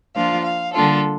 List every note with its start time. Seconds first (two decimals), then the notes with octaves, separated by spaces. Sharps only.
0.15 F3 A#3 D4 F4 F5
0.44 F5
0.73 D3 G3 A#3 D4 F4 A4